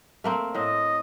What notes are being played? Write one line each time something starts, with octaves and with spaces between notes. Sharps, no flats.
A3 A#3 C4
A2 C4 D#5